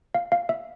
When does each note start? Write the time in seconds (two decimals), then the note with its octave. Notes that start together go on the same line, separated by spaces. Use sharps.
0.15 F5
0.32 F5
0.49 E5